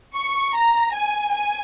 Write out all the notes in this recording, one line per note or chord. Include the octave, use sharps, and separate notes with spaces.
C#6
A#5
G#5
G#5